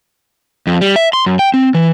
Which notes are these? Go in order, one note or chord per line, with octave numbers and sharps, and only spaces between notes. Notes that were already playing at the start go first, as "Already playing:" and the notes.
F2
G3
E5
C6
F#2
G5
C4
E3